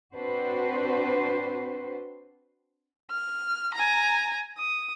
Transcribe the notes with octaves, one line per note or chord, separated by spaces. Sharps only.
C4 D4 F#4 B4 C5
F6
G#5 A#5
D#6